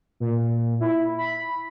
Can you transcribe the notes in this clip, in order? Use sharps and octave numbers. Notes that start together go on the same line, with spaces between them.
A#2
E4
B5